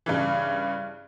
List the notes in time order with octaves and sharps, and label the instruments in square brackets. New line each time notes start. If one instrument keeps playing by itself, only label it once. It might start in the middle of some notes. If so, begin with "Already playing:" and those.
[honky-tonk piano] G2 C#3 E3